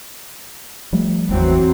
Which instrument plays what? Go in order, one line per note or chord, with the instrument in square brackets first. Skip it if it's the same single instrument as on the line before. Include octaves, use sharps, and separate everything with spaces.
[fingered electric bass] F3 G3 A3
[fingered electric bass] G#1 E2 [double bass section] E3 F#3 C4